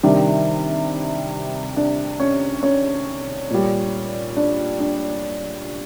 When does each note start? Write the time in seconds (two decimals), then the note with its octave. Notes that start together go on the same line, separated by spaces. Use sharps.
0.03 C3 D#3 G3 D4
1.77 D4
2.20 C#4
2.63 C#4
3.50 A#2 G3
4.36 D4
4.80 D4